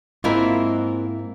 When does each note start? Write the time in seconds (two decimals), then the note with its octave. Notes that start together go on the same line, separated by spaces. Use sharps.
0.24 G#2 A#3 C4 E4 F4 A#4 E5